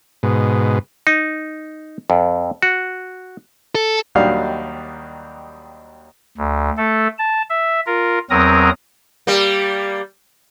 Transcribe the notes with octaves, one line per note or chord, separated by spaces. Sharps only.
G#2 B2
D#4
F2
F#4
A4
D#2 D#3 F#3 G3 D4 F5
D2
A3 A4
A5
E5
F4 A#4
E2 F#3 C4 A#4 A#5 D#6
G3 A#3